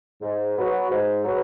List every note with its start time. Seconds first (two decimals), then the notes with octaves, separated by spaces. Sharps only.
0.21 G#2
0.55 F#3 B3 F#4 B4
0.90 G#2
1.24 F#3 B3 F#4 B4